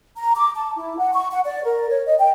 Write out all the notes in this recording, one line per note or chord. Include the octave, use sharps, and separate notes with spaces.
A#5
D6
A5
E4
F#5
C#6
F#5
D5
A#4
C#5
D#5
G5